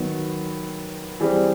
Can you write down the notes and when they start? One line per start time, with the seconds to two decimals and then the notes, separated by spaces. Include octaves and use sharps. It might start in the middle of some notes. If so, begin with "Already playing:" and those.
Already playing: D#3 F#3 B3
1.20 E3 G3 C4 G#4